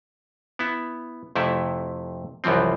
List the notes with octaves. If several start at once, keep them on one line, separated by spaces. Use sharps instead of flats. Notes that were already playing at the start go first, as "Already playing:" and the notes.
B3 E4
F2 C3 A3 E4
C2 F#2 E3 F3 C4